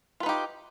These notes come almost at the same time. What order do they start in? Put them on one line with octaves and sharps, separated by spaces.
F4 B4 D#4 G4